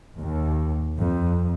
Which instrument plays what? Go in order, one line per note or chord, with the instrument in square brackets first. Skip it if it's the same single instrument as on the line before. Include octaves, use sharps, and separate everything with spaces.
[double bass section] D#2
F2